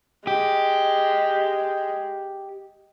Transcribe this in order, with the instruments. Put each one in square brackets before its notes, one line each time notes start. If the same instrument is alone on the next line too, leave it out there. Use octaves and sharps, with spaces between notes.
[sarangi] G#3 [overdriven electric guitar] G4